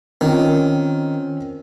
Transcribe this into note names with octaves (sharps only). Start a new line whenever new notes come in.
D#3 C4 C#4 F4